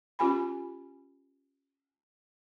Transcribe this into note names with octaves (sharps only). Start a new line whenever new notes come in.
C#4 F4 G4 G#5 B5